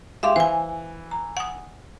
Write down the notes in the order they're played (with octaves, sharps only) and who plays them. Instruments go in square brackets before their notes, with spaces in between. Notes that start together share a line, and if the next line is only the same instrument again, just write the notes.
[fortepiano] G#3 G4 D6 [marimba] E5 F5 C6
[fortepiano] E3 [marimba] C5 G#5
[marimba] A#5
F#5 D#6